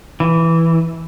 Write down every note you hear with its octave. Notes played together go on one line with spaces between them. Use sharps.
E3